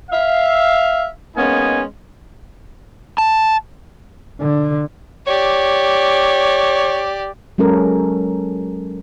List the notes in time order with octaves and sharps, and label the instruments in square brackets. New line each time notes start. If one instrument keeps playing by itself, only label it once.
[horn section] E5 F5
G#3 A#3 B3 C#4 D#4 G#5
[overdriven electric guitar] A5
[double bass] D3
[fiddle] G4 D5 [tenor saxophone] C#5
[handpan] F#3 G#3 C#4 A4 A#4